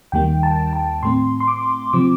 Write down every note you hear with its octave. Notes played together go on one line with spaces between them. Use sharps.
D#2 D#3 G3 A#3 G5
A5
A5
A2 A3 C4 C6
C6
D6
C3 F3 C4 D6